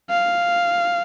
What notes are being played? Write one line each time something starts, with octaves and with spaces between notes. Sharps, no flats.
F5